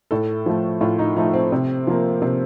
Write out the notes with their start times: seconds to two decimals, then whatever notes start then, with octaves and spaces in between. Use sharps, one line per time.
0.11 A2 A4
0.46 F3 A3
0.81 A2 F4
0.99 D#4
1.17 F3 A3 D#4
1.34 C4
1.52 C3
1.87 F3 A#3
2.22 C3 C4